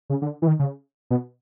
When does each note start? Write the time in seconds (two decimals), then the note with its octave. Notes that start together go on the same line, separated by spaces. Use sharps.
0.10 C#3
0.22 D3
0.42 E3
0.47 D#3
0.60 C#3
1.11 B2